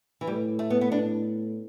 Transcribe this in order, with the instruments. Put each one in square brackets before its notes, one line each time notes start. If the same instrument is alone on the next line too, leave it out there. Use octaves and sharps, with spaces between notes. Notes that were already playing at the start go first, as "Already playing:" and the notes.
[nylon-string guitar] E3
[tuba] A2 [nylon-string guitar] G3
[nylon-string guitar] A3
B3
B3
D4